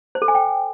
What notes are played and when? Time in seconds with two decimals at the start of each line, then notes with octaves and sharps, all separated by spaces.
0.15 C5
0.22 A4
0.28 G#5
0.35 G5